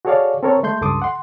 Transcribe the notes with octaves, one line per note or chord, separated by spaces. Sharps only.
F#4 G#4 A4 C#5 D5 F5
C4 A4 A#4 C#5
G#3 A3 C6 G6
C#2 G2 A4 C6 D6 D#6
F#5 C6